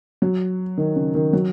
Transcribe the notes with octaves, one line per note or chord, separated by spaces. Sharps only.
F#3
D#3
C#3
D#3
F#3